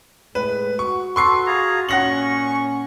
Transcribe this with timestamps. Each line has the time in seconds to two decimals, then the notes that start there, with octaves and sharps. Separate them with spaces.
0.35 A2 G#3 B4
0.79 F#4 C#6
1.16 A4 B4 C6 C#6 C7
1.47 F4 G#4 A#5
1.89 A#2 C#4 F#5 C#6 A#6 F#7